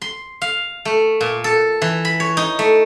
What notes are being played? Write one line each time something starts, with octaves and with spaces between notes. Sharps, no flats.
C6
F5
A3
A#2
A4
E3
B5
C#5
D#4
A3